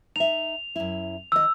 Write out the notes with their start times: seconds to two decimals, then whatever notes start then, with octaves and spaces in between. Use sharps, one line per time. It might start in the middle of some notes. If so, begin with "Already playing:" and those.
0.16 D#4 E5 F7
0.76 F#2 E4
1.32 D#3 D#5 E6